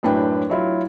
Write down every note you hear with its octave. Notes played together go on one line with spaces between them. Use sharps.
F#2 A2 D4 B4 G5
F#3 E4 F4